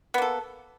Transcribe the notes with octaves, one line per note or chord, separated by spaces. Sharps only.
A#3 B3 A4